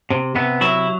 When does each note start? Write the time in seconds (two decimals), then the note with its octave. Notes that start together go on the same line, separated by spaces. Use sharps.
0.10 C3
0.35 C3 B3
0.61 F#3 E4